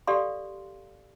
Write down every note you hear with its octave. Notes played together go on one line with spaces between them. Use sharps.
G4 A4 D5 F5 C6